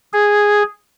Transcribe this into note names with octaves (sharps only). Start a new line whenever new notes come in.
G#4